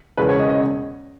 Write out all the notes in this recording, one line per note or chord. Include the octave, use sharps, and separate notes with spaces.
E1 E2 C#3 B4
C#5
D#5
D#5